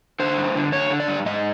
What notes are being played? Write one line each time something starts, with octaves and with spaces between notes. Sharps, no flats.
D3 C5
G2
D3
D3 C#5
D3
D5
G2
G#2 D#5